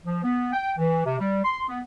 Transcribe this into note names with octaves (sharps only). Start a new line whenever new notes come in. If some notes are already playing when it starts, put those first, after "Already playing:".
F3
B3
G5
E3
C3
G3
C6
B3